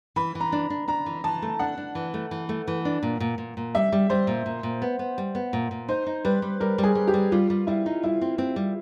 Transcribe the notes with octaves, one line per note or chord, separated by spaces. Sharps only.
E3 B5
E3
A#5
D4
D4
D4 A#5
E3
E3 A5
A3
D4 F#5
D4
E3
A3
E3
A3
E3
D4
A#2
A#2
A#2
A#2
G3 E5
G3
G3 C5
A#2
A#2
A#2
B3
B3
G3
B3
A#2
A#2
D#4 C5
D#4
G3 B4
G3
G3 A#4
G3
G#4
G3
G4
G3
G3 F4
G3
G3 E4
D#4
G3 E4
C4
C4
G3